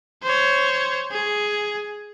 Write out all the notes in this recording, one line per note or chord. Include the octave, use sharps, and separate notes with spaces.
C5 C#5
G#4